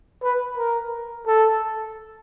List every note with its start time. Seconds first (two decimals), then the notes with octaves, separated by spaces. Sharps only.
0.23 B4
0.57 A#4
1.27 A4